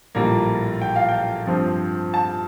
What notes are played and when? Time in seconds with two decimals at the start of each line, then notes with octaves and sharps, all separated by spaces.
0.15 A#1 A2 G3 A#3
0.81 G5
0.96 F5
1.09 G5
1.47 G2 F3 C4
2.14 A5